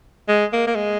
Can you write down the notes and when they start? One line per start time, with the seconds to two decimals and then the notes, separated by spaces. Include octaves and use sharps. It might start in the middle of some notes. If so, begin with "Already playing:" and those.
0.28 G#3
0.53 A#3
0.67 A#3
0.75 G#3